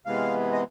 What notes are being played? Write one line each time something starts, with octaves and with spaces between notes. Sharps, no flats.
C3 E3 G#3 B3 F5
D#5